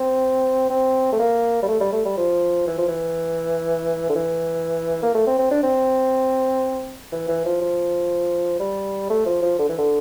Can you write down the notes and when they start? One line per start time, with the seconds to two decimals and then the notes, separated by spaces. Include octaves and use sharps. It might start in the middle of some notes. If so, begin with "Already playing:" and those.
Already playing: C4
0.70 C4
1.12 A3
1.19 A#3
1.63 G3
1.68 A3
1.81 G3
1.92 A3
2.05 G3
2.17 F3
2.67 E3
2.78 F3
2.88 E3
4.09 D3
4.15 E3
5.03 A#3
5.15 A3
5.27 C4
5.39 C4
5.51 D4
5.63 C4
7.12 E3
7.28 E3
7.45 F3
7.61 F3
8.60 G3
9.10 A3
9.26 F3
9.42 F3
9.59 D3
9.69 E3
9.78 D3